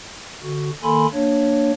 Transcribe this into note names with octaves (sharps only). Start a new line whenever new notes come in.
D3 F#4
D#3 A#3 A4 G#5 B5 C6
A#3 D4 C#5